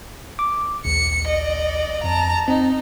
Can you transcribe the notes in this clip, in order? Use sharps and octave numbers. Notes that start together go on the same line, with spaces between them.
D6
A#1 D#2 C#7
D5 D#5
F2 A5 A#5
C4 D#4